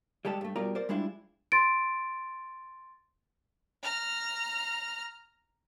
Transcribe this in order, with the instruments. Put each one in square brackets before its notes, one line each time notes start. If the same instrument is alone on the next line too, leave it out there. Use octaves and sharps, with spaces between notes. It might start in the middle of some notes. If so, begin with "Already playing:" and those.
[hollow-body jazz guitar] G3 G#3 G4 A4
G2 A3
B2 G3 F4 A#4 D5 A#5
A#4 C5 D5
G3 G#3 D4 E4 F4
[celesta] C6 A6 D7
[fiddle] A#5 F6